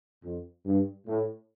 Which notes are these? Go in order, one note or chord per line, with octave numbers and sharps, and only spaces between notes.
F2
G2
A2